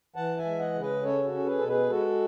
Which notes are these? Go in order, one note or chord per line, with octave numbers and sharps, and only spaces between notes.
E3 F#5 A5
E5 G#5
G#3
D#5 F#5
C#3
B4 D#5
C#4 A4 C#5
F#4 A4
C#4
G#4 B4
B2 A4
G#4 B4
G#3 F#4 A4